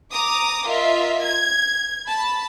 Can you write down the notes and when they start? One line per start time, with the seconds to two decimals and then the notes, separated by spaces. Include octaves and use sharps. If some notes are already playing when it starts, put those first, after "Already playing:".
0.12 A#5 D6 D#6
0.67 F4 A#4 D#5 E5
1.22 G#6
2.06 A5 B5